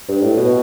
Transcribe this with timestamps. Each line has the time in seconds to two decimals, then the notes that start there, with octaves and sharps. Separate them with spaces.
0.08 G2
0.22 A2
0.37 B2